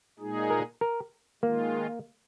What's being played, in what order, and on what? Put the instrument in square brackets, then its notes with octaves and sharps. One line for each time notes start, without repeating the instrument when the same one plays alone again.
[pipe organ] A#2 G#3 D#4 G#4
[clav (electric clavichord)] A#4
A#4
[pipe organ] D#3 G#3 F4 [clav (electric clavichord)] A#3